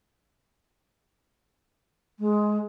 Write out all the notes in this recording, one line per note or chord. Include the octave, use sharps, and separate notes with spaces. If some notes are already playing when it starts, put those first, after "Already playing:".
G#3